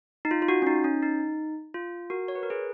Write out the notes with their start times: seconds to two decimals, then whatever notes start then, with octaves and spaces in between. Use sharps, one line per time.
0.25 D#4
0.31 F4
0.42 F4
0.48 F#4
0.62 C#4
0.67 D#4
0.84 C#4
1.02 D#4
1.74 F4
2.10 F#4 A#4
2.28 C#5
2.35 B4
2.43 A#4
2.50 G#4 B4